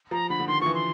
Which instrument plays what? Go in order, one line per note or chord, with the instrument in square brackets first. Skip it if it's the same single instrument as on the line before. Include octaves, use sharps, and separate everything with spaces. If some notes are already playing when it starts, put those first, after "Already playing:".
[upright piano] F3 [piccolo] A#5
[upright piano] D3 [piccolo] B5
[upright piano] D3
[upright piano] D#3 [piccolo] C6
[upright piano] F3 [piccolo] C#6
[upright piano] E3
[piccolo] C6